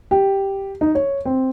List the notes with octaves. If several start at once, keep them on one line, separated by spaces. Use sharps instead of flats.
G4
D#4
C#5
C4